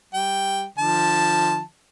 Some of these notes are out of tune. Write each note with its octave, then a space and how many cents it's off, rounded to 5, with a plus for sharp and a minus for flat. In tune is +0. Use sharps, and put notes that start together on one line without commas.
G3 +0 G5 +0
D3 +35 F3 +0 A5 +0